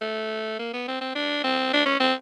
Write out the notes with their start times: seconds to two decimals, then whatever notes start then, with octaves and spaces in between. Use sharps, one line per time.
0.01 A3
0.59 A#3
0.73 B3
0.88 C4
1.01 C4
1.15 D4
1.44 C4
1.73 D4
1.86 C#4
2.00 C4